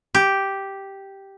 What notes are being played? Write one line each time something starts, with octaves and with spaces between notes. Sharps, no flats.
G4